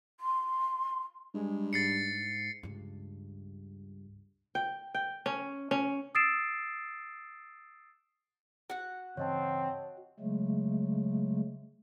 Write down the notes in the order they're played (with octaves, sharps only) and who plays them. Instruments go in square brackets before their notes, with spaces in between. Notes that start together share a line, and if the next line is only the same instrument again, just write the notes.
[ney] C6
[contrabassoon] G2 [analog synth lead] G#3
[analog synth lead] G#2 [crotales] A6 C7 C#7
[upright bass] C#2 G2
[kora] G5
G5
C#4
C#4
[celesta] D#6 E6 A6 C7 D7 E7
[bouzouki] F#4 F#5
[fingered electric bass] G2 C#3 E3 [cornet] C4 [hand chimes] C#5 D#5 A5
[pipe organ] C#3 F#3 G#3 A3